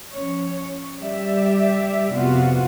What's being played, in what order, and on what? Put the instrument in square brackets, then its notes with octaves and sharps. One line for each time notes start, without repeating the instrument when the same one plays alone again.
[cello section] F3 C#4 C#5
G3 G4 D5 E5
F2 C3 B3 F4 F#4